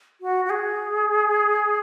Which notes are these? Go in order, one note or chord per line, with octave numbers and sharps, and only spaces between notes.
F#4
F#4
G#4